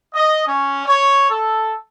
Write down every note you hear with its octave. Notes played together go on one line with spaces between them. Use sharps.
D#5
C#4
C#5
A4